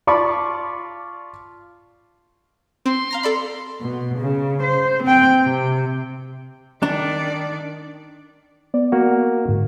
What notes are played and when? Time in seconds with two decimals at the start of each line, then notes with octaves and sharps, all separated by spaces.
0.07 F4 D5 A5 B5 C#6
2.86 C4 C6
3.11 F5 A#5 A#6
3.23 A4 D5 B5
3.81 B2
4.19 C#3
4.62 C5
5.03 C4 G5
5.42 C3
6.83 D#3 D4 D5
8.74 B3 D5
8.92 A#3 F#4 F#5
9.47 G#2 D3